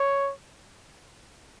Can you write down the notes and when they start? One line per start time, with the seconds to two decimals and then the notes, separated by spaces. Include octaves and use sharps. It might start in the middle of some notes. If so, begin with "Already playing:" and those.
Already playing: C#5